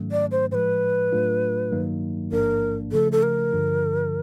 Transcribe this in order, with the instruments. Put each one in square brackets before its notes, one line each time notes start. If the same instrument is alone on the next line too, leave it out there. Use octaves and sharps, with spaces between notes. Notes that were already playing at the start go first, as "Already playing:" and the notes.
Already playing: [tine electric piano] G#2 D#3 F#3 A3 C#4
[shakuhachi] D5
C5
[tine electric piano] A2 F3 G#3 [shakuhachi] B4 C5
[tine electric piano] A2 F#3 A3 D4 F4
G2 D#3 F#3 A#3 D#4
[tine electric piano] A1 G#2 F3 A#3 D4 [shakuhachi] A#4
[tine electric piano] C#3 F3 A3 [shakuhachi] A4
[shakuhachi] A4
A#4
[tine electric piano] G2 D3 F3